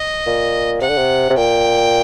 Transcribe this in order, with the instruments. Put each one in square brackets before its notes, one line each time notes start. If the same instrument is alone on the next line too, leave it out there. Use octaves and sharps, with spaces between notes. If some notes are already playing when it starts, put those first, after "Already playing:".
Already playing: [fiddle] D#5
[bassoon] A#2
[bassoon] C3 [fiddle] F#5
[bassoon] D3
C3
C3
[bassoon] A#2 [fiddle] G5